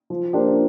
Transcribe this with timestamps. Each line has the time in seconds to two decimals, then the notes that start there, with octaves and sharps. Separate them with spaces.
0.10 F3
0.33 A#3 D4 G4 C5